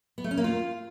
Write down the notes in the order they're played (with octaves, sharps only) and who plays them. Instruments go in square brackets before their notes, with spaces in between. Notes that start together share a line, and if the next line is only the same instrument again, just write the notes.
[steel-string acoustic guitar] B3
A3
C#4
A#3
F4